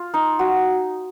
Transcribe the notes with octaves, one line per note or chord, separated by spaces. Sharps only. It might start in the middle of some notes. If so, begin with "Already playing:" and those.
Already playing: F4
D#4
F#4